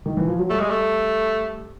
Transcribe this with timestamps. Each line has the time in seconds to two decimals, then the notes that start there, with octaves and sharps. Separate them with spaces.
0.06 D#3
0.17 E3
0.27 F3
0.39 F#3
0.50 G3 A3
0.60 G#3
0.70 A3